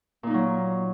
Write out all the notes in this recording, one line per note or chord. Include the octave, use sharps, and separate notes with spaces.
A#2 F#3 A#3 D#4